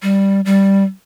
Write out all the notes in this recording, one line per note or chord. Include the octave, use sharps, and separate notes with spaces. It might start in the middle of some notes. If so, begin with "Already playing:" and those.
G3
G3